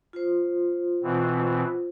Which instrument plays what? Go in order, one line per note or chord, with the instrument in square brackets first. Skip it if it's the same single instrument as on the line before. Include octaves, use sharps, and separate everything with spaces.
[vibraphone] F4 C5
[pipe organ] B2 E3 C4